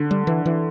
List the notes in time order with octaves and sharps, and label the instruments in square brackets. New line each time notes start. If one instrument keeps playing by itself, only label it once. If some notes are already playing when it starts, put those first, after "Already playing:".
Already playing: [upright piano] D3
[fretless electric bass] G3
E3
E3